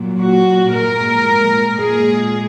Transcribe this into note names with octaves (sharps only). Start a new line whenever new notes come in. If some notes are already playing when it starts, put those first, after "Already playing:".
Already playing: A#2 F#3
F#4
A#2 G#3 A#4
A#2 G#3 G#4